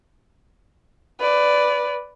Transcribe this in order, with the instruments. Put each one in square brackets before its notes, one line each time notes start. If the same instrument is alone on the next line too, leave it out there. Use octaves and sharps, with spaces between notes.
[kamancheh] B4 D5